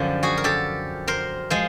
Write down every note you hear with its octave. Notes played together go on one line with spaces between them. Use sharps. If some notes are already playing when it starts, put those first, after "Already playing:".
Already playing: F#2 D3 F3 F4 G4
F#4 G#4
A#4
G4 A4
A#4 C5
F3 G#3 C5